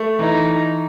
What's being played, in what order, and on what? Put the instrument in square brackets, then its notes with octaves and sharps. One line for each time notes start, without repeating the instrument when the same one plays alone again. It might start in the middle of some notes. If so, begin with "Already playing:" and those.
Already playing: [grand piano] A3
[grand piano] E3 [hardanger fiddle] D#4